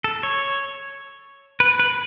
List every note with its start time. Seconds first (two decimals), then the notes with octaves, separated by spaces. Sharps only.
0.04 A4
0.23 C#5
1.60 B4
1.79 B4